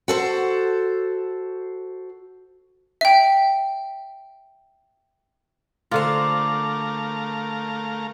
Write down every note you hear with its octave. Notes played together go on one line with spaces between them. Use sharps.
F#4 A4 C5
E5 G5
D3 A3 F4 A#4 C5 D5 F5